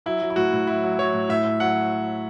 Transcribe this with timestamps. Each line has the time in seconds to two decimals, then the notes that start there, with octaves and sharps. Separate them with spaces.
0.06 F#3 E4
0.22 F#3
0.30 E4
0.36 A2 F#4
0.53 A2
0.67 F#3 E4
0.84 F#3
0.99 F#3 C#5
1.14 A2
1.29 A2 E5
1.45 A2
1.60 F#3 F#5